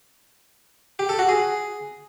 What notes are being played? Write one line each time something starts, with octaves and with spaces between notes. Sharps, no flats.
G4
A4
F#4
G#4